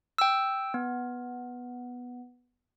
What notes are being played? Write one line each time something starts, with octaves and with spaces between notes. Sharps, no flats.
G5 E6
B3